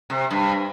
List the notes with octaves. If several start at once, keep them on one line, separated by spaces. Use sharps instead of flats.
C3
G2